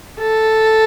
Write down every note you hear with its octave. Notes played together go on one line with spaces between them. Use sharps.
A4